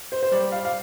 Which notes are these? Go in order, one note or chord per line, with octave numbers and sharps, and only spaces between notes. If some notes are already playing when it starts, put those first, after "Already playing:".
C5
C5
G3 D5
F5
F5